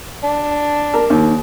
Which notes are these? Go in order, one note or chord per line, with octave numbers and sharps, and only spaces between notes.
D4
A#4
D#2